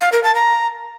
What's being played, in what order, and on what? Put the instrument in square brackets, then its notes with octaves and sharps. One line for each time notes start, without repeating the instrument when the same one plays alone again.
[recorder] F5
A#4
A5
A#5